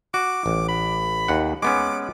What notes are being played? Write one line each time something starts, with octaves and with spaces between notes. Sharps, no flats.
F#4 D6
A1
B5
D#2 F#5
G#3 B3 C#4 D6